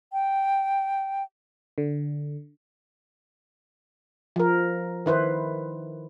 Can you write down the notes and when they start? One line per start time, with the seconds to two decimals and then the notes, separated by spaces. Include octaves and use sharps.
0.13 G5
1.78 D3
4.36 F3 A#4
5.06 D#3 E4 B4 C5